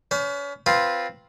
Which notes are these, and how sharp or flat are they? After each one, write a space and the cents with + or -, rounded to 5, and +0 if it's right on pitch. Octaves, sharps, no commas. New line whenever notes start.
C#4 +35 C5 -35
C4 +0 F4 +0 B4 -10